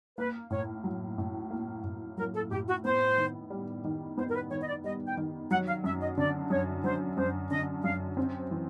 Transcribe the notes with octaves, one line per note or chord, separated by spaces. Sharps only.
A#3 B4
A2 C#5
F#3
A2
A#3
A2
F#3 A#4
A4
A2 G4
F#4
B3 C5
D#3
G3
D#3
B3 C5
A#4
B4
D#3 C#5
D#5
D5
G3 D#5
G5
D#3
F#3 F#5
F5
F#2 E5
D#5
D3 D5
F#2 C#5
F#3 C5
F#2 C5
D3 D#5
F#2 F5
C4
E3